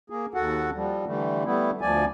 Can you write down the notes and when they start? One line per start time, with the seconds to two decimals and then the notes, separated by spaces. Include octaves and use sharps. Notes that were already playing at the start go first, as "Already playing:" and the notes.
0.10 A#3 G#4
0.34 D#2 F#4 A4 F#5
0.75 F3 G3
1.07 D3 E3 G3 A3
1.45 G3 A3 B3 E4
1.81 D2 F3 D5 G#5